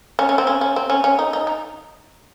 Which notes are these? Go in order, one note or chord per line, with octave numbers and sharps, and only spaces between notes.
C#4
C#4
C4
C#4
C#4
C4
C#4
C#4
D#4
D#4
D#4